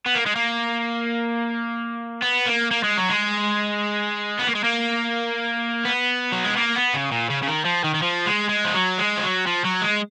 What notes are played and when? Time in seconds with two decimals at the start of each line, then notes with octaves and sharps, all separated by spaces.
0.06 B3
0.15 A#3
0.26 G#3
0.36 A#3
2.22 B3
2.47 A#3
2.71 A#3
2.84 G#3
2.97 F#3
3.09 G#3
4.39 B3
4.47 A#3
4.55 G#3
4.64 A#3
5.85 B3
6.32 F#3
6.44 G#3
6.57 A#3
6.75 B3
6.94 C#3
7.11 A#2
7.30 C#3
7.42 C#3
7.47 D#3
7.65 F3
7.84 D#3
7.94 D#3
8.02 F3
8.26 G#3
8.49 G#3
8.65 F3
8.74 F#3
8.98 G#3
9.17 F3
9.23 F#3
9.47 F3
9.65 F#3
9.82 G#3